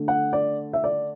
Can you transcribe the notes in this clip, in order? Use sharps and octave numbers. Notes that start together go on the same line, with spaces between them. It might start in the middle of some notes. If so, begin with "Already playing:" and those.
Already playing: D3 A3
F#5
D5
E5
D5